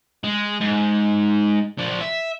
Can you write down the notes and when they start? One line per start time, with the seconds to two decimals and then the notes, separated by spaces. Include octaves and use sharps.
0.24 G#3
0.61 G#2
1.78 F3 D4
2.01 E5